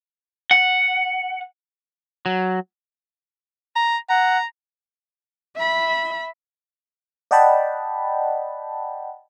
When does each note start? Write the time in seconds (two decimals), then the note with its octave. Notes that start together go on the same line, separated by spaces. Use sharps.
0.51 F#5
2.26 F#3
3.76 A#5
4.10 F#5 A#5
5.56 E5 B5
7.31 D5 D#5 F#5 G5 A5 B5